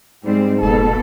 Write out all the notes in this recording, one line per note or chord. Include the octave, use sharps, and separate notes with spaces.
G#2 G3 G#3 C4
F1 B2 A#3 A4